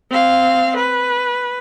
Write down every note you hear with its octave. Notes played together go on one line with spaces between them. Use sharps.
C4 F5
B4